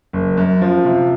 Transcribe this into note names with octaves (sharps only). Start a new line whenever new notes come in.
F#1
F#2
F3
C3